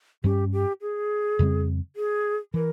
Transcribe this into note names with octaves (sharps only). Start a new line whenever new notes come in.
G2 G3 C#4 G4
G4
G#4
F2 C#3 G3 C4
G#4
E3 A#4